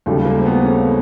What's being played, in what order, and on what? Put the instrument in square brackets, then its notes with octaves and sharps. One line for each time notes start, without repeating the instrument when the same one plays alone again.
[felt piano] D#2 C#3 F#3 [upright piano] G3 A3
[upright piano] G#3 A#3
C4
A3 B3
B3 C#4